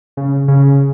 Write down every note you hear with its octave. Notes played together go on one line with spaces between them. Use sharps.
C#3
C#3